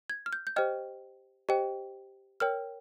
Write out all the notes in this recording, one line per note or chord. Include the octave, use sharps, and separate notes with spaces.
G#6
F6
G6
G6
G4 C5 D#5 G5 F6
G4 C5 D#5 G5
A#4 C#5 G5 F6